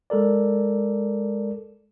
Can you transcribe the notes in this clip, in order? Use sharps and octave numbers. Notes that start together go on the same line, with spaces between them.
G#3 A4 A#4 D5